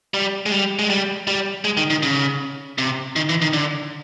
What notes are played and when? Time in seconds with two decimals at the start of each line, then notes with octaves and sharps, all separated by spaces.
0.14 G3
0.46 G#3
0.52 G3
0.79 G#3
0.90 G3
1.27 G3
1.64 G#3
1.77 D#3
1.90 D#3
2.03 C#3
2.78 C3
3.16 D#3
3.29 E3
3.42 D#3
3.53 D3